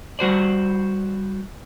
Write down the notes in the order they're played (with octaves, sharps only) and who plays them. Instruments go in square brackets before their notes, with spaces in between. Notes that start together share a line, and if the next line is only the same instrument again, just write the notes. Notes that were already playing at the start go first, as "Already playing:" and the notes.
[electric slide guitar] G3 F#4 C5 D5